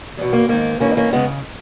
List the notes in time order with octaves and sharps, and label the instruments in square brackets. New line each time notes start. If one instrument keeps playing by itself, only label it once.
[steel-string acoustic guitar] E2 B2
A#3
G#2 D#3 A#3
G#2 E3 A#3 C#4
D#4
A#3 C#4
C#3 G#3 B3